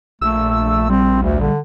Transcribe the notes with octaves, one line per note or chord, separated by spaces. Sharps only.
A#1 A3 E6
G3 C4
D2
D3